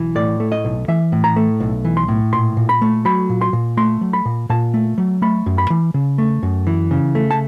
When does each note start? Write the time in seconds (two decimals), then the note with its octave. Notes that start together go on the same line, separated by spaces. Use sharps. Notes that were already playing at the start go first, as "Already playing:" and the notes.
Already playing: B1 E3
0.15 A2 D5
0.40 A3
0.52 D#5
0.65 B1
0.88 E3 E5
1.12 A2
1.24 A#5
1.36 A3
1.60 B1
1.85 E3
1.97 C6
2.08 A2
2.33 A#2 C6
2.57 A#2
2.69 B5
2.82 A3
3.05 F#3 B5
3.29 A#2
3.41 C6
3.53 A#2
3.77 A3 C6
4.01 F#3
4.13 B5
4.25 A#2
4.49 A#2 A5
4.74 A3
4.98 F#3
5.22 A3 B5
5.46 F#2
5.58 B5
5.70 E3
5.94 C#3
6.18 A3
6.43 F#2
6.67 E3
6.91 C#3
7.15 A3
7.31 A5